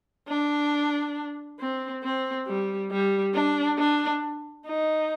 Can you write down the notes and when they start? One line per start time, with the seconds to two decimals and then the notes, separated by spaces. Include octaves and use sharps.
0.29 D4
1.60 C4
2.03 C4
2.48 G3
2.91 G3
3.34 D4
3.78 D4
4.66 D#4